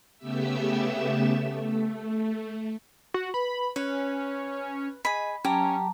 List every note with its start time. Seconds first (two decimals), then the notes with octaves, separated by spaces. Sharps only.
0.18 C#3 A3 B3 G4 E5 E6
1.36 A3
3.14 F#4
3.34 B4 B5
3.76 C#4 B4 C#5
5.05 G#4 D#5 B5
5.45 F#3 C#4 G4 A5 A#5